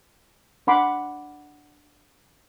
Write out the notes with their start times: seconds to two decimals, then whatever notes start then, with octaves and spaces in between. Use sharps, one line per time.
0.67 D4 F5 F#5 B5 C6 D6